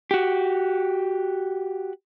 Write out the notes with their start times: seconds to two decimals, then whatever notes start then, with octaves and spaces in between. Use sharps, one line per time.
0.11 F#4 G4